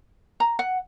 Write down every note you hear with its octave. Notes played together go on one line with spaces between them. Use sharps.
A#5
F#5